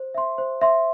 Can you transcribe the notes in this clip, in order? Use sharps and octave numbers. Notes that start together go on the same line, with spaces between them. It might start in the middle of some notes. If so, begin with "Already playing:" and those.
Already playing: C5
E5 C6
C5
E5 C6